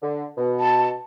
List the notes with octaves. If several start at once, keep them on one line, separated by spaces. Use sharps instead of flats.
D3
B2
A5